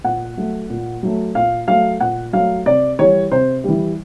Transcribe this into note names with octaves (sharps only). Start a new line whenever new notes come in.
A#2 F#5
F#3 A3
A#2
F#3 A3
A#2 F5
F#3 A3 F5
A#2 F#5
F#3 A3 F5
C3 D5
E3 G3 C#5
C3 C5
E3 G3